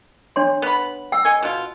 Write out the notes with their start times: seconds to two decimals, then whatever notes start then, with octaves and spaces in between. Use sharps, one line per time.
0.36 D4 C#5 C6
0.62 B3 B5
1.12 G5 E6
1.25 C#5 D#5 G#5
1.42 B2 F4